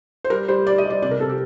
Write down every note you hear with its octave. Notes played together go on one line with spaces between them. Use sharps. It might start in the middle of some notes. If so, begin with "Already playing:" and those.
C5
G3 A#4
G3 C5
G3 D5
D#5
G3
D5
C3 D5
A#4
C3 A4
G4